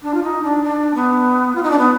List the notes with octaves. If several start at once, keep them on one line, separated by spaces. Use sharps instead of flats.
D4
F4
D#4
D4
D4
B3
F4
D#4
D4
B3